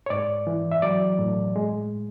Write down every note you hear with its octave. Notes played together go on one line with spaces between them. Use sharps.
C#5
G#2 D5
E3
E5
F#3 D5
A2
G#3